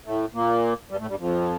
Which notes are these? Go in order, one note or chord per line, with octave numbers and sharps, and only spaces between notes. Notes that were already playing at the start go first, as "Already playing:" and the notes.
A2 A3
A#2 A#3
G2 G3
A2 A3
G2 G3
F2 F3